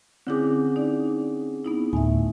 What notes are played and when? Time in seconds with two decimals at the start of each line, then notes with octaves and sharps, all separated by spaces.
0.27 D3 C4 C#4 E4 G#4 D6
0.76 D#4 D5
1.65 B3 D#4 E4
1.93 D2 A2 E5 G#5